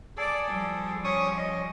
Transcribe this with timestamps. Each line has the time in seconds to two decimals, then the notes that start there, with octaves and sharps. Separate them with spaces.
0.17 G#4 A4 D5
0.50 F3 G3
1.04 C#4 C#6 D#6
1.38 C#4 D#5